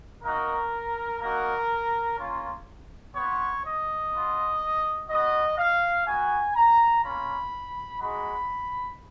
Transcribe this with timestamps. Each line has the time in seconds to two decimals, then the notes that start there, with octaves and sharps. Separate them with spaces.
0.23 A#3 D#4 F#4 A#4
1.20 A#3 D#4 F#4 A#4
2.18 A#3 C#4 F4
3.15 B3 F4 C#5
3.63 D#5
4.12 B3 F4
5.09 B3 F#4 D#5
5.58 F5
6.06 B3 F#4 G#5
6.55 A#5
7.03 A#3 C#4 F4 B5
8.00 G#3 D#4 F#4 B5